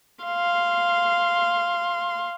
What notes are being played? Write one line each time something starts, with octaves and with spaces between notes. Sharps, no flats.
F5 C6